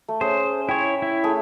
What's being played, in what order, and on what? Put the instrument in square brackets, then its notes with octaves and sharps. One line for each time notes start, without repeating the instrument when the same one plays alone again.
[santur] A3
[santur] C#4 G#4 [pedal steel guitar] C5
[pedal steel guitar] E4 C#5 [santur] G5
[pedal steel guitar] E4
[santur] A3 G#4 E5